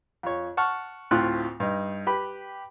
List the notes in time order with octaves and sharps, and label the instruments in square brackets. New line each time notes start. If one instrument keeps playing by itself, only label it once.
[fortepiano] F2 C#5
F#5 A5 C#6 F6
D2 A2 C4 F4 F#6
G2 D#4
G4 B4 B5